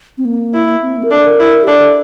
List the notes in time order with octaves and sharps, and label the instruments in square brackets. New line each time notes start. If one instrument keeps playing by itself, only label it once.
[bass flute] C4
A#3
[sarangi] E4
[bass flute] C4
A#3
A#4
[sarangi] D4 [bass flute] A4
[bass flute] A#4
[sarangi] E4
[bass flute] G4
[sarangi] D4 [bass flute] A4